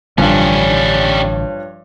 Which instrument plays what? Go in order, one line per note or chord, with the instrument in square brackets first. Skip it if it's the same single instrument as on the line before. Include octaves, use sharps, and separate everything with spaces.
[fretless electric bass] A1 D3 [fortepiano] G2 F3 [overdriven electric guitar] G3 C#4 [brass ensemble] C#5